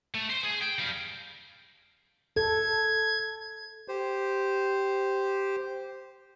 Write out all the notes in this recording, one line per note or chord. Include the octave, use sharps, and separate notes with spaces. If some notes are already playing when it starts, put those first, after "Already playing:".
A3
C5
G#4
G5
G3 F5
A4 G#6
G4 C5